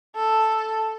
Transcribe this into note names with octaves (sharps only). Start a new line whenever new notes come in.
A4